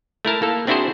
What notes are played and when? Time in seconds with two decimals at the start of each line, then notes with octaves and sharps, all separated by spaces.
0.25 A3 E4 A#4 A5
0.42 A#3 A4
0.67 C4 D4 E4 F#4 G#4 C5